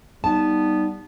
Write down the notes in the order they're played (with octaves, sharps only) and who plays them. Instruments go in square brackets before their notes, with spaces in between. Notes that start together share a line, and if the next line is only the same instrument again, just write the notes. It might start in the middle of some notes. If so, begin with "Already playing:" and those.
[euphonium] G3 [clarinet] B3 [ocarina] D#4 [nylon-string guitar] A5